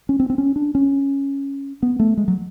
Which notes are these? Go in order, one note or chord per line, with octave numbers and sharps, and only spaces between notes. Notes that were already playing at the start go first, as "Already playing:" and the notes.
C#4
C4
C4
C#4
D4
C#4
B3
A3
G#3
F#3